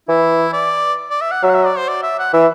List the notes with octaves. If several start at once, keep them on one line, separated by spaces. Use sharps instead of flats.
E3 E4
D5
D5
E5
F#5
F#3 E5
F#5
E5
D5
C5
D5
E5
F#5
E3 E5